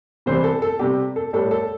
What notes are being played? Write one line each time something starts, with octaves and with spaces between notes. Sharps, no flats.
C3 E3 G3 C5
A4
A4
C3 G3 G4
A4
A2 G3 A4
A4